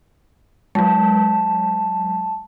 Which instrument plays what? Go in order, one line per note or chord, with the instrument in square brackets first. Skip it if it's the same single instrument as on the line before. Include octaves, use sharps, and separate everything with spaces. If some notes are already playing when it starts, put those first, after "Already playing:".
[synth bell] F#3 G#3 [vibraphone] A5